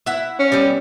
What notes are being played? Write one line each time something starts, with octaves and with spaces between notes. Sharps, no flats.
E4 E5 F#5
C#4
G3 B3 C4